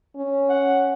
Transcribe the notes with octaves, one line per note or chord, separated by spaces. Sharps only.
C#4
F#5